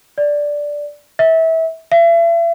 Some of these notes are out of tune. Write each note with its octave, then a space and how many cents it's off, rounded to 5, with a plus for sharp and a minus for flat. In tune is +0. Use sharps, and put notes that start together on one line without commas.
D5 -5
E5 -25
E5 +40